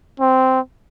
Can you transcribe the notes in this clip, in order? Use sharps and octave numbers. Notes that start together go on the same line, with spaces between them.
C4